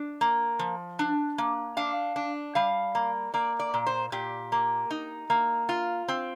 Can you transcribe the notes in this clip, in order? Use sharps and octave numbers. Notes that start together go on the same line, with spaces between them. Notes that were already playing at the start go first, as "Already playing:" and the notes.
Already playing: D4
A#3
F3
D4
A#3
D4 F5
D4
G3 F5
A#3
A#3 D5
D5
A#2
C5
A#2 G4
A#3
D#4
A#3
F4
C4